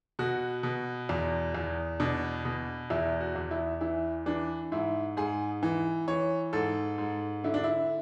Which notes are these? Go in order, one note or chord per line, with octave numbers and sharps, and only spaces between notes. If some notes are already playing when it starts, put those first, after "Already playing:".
B2 F#4
B2
E2
E2
B2 D4
B2
E2 E4
F#4
E2
E4
E3 E4
E3 D4
G#2 E4
G#2 G#4
E3
E3 C#5
G#2 A4
G#2
D3 E4
D4
E4